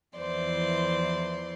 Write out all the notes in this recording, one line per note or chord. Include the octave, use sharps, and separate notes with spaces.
E2 E3 F3 C5 D5 C6